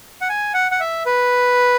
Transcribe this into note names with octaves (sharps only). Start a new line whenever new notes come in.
F#5
G#5
F#5
F#5
E5
B4